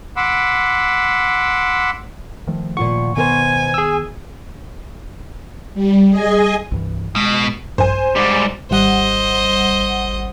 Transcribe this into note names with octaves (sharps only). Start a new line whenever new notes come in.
F#5 B5 C6 D6 E6
D#3 F3 A3
A#2 F4 F#5 C#6
B2 D#3 B3 A#4 C5 G#5
G#4 E6
G3
G#4 D#5 G#5
C2 G2 E3
B2 G#3
A#1 G2 C5 G#5
G#2 G3 D5
G#1 G3 C5 D#5 F#5